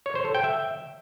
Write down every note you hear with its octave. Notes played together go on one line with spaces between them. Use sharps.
C#5
C5
A4
G5
E5